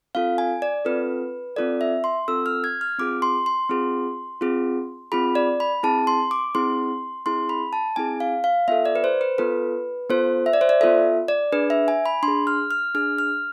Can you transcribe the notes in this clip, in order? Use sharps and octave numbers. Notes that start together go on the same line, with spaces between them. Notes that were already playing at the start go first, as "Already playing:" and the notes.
C4 F4 A4 F5
G#5
D5
C4 F4 A4 B4
C4 F4 A4 D5
E5
C6
C4 F4 A4 E6
F6
G#6
F6
C4 F4 G#4 D6
C6
C6
C4 F4 G#4
C4 F4 G#4
C4 F4 G#4 B5
D5
B5
C4 E4 G#4 A5
C6
D6
C4 E4 G#4 C6
C4 E4 G#4 C6
B5
A5
C4 E4 G#4 G#5
F5
F5
B3 F4 A4 E5
D5
B4
C5
B4
B3 F4 A4 B4
B3 F4 A4 C5
E5
D5
C5
D5
B3 F4 A4 E5
D5
D4 G#4 B4
E5
G#5
B5
D4 C6
G#4
F6
F6
D4 G#4 F6
F6